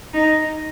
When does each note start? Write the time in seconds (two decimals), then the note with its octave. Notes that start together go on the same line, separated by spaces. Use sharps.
0.14 D#4